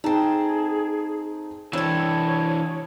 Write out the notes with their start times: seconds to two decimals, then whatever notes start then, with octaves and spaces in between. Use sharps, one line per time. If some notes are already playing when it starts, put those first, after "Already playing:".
0.04 C4 D#4 G#4 A4
1.73 E3 C4 D4 A4 C#5 E6